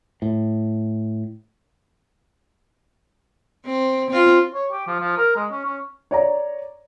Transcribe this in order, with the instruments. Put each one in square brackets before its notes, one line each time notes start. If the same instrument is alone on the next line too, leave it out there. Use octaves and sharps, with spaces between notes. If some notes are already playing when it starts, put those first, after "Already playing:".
[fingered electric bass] A2
[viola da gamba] C4
C4 F4
[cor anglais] C#5
G4
F3
F3
A#4
G#3
C#4
C#4
[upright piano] C#5 D5 A#5